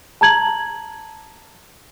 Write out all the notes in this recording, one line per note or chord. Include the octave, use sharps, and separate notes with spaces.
A5 A#5 G#6 F#7